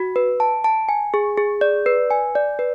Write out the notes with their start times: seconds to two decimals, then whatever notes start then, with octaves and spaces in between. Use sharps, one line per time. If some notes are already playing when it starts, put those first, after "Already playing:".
Already playing: F#4
0.16 B4
0.40 A5
0.64 A5
0.89 G#5
1.14 G#4
1.37 G#4
1.61 D5
1.86 B4
2.11 G#5
2.35 D5
2.59 B4